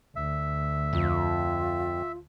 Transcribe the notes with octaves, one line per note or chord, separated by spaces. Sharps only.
D2 E5
F2 F4